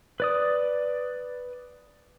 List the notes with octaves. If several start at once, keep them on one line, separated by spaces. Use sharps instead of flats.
B4 D5 D#6